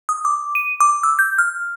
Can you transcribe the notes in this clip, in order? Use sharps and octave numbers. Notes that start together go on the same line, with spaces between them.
D#6
D6
D#7
D6
E6
G6
F6